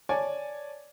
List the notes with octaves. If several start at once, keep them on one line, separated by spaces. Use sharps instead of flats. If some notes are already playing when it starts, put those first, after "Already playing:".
C#5 D5 G#5 A5